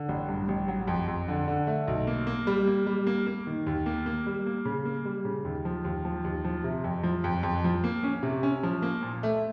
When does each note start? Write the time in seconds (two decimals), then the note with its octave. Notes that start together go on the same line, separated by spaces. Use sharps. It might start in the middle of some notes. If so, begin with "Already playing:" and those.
Already playing: D3
0.09 A1
0.28 G2
0.48 A1
0.68 F#3
0.87 F2
1.08 F2
1.28 D3
1.48 D3
1.67 A3
1.87 B1
2.07 A#3
2.27 A#3
2.47 G3
2.67 A#3
2.87 G3
3.07 A#3
3.26 A#3
3.47 D#3
3.66 D#2
3.86 A#3
4.06 A#3
4.26 G3
4.46 A#3
4.65 C#3
4.85 A#3
5.05 G3
5.25 C#3
5.45 D#2
5.65 F3
5.85 D#2
6.05 F3
6.24 D#2
6.44 F3
6.64 C3
6.84 F2
7.03 F3
7.24 F2
7.43 F2
7.64 F3
7.84 A#3
8.04 C#4
8.23 C3
8.43 C#4
8.63 F3
8.82 A#3
9.02 A#2
9.23 A3